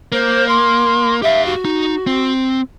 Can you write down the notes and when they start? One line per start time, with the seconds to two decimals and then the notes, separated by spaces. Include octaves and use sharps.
0.12 A#3 C5
0.48 C6
1.22 G4 E5 F5
1.45 F#4
1.65 D#4
2.07 C4